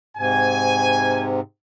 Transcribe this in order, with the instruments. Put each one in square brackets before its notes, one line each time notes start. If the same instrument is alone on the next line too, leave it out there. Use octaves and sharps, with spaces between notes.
[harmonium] G#2 C3 [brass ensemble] G#5